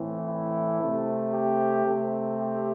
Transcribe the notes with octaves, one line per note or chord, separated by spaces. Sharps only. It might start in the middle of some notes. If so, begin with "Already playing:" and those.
Already playing: A2 E3 A3 C4
E4
C3 A3 C4
G4
C3 A3 C4
G4